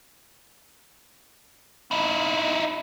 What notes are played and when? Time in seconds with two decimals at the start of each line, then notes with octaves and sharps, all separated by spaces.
1.91 D#4 E4